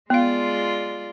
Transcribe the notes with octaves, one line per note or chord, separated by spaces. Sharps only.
G#3 B3 F4 D5 F5